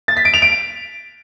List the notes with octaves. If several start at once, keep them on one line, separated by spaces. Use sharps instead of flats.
A6
B6
D7
F7
D7